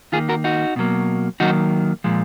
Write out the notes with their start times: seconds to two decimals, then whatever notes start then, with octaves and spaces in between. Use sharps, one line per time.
0.12 D#3 A#3 F4 G#4
0.29 F#4 A#4
0.44 D#4 F#4
0.76 B2 F#3 A#3
1.40 D#3 F#3 A#3 D#4 F#4
2.04 A#2 F3 G#3